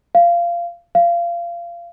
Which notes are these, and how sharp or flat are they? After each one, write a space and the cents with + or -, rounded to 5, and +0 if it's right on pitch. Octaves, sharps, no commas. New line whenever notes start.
F5 -20
F5 -25